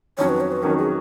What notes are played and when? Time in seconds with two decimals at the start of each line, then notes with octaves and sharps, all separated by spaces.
0.18 F2 D#3 F#3 C#4 C#5
0.29 B4
0.40 C#5
0.52 B4
0.62 F2 D#3 F#3 C#4 A#4
0.78 G#4